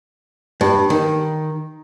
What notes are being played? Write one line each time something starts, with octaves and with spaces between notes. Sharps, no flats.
G2
D#3